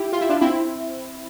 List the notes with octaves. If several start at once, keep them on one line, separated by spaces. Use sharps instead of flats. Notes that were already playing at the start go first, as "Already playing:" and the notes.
Already playing: E4 G4
F4
E4
D4 F4
C4 E4